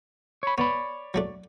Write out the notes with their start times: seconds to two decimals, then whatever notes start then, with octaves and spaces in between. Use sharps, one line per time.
0.43 C#5 B5
0.58 B3 C#5 D5 B5
1.14 F#3 A3 D4